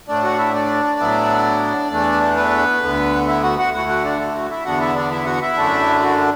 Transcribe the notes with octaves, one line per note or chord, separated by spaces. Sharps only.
A2 A3 D4 D5
F#4 F#5
E4 E5
D4 D5
A2 F#3 B3 E4
E2 E3 A3 D4
B3 B4
D2 D3 B3
E4 E5
F#4 F#5
F#4 F#5
D2 D3 A3 E4 F#4 F#5
F#4 F#5
D4 D5
A4
F#4
E4 E5
E2 D3 B3 D4 F#4 F#5
E4 E5
D4 D5
E4 E5
F#4 F#5
E4 E5
F#2 D3 A3 D4
F#4